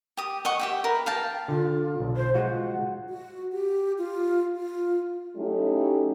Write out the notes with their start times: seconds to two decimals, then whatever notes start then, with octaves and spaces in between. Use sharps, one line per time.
0.17 G4 D#6
0.45 D#5 F#5 C#6
0.60 G4 E5 G5
0.84 A#4 B4
1.06 F5 G5 A5
1.48 D3 F4
2.00 B1
2.16 C5
2.35 G#3 F4 F#4 F#5
3.09 F#4
3.53 G4
3.98 F4
4.56 F4
5.37 F#3 A3 C#4 D#4 E4 G4